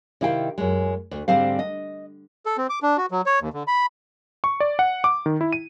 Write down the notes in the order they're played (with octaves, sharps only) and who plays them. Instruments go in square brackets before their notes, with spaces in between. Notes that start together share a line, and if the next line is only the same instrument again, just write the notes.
[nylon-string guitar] C3 D#3 E4 F5 G5
F#2 G#3
D2
G#2 D3 G3 C4 C5 F5
D#5
[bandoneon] A4
C4
D6
D4
F#4
F#3
C#5
D#2
D3
B5
[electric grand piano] C#6
D5
F#5
D6
D#3
E4
D#7